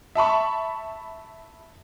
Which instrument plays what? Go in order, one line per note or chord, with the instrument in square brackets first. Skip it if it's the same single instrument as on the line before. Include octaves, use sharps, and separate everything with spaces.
[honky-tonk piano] E5 A5 B5 C#6